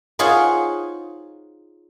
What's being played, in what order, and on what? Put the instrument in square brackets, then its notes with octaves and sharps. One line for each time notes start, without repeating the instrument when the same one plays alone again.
[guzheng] D#4 F4 G#4 C5 C#5 F#5